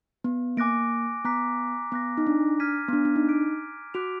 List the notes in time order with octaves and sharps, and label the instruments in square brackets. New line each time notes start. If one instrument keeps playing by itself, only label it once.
[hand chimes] B3
[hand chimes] A#3 [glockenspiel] G#5 D6 F#6 A#6 D7
[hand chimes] B3 [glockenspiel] A#5 D6 F#6 B6
[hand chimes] B3 [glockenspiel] D6 F#6 A#6
[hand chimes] D#4
D4
[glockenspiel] F6 G#6 B6 D#7
[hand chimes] B3
D4
D4
D#4
[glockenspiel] D6 F#6 B6 D7
[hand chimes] F#4 [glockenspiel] D6 F#6 B6 D7 F7